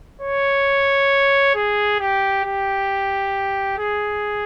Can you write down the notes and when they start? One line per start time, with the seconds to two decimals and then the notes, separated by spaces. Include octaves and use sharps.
0.21 C#5
1.55 G#4
2.00 G4
2.44 G4
3.78 G#4